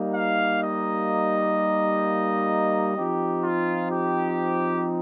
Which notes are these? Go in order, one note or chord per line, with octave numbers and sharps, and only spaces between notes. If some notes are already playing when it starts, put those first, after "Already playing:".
Already playing: G3 A#3 D#4
F5
D#5
F3 C4 D#4 G4
F4
G4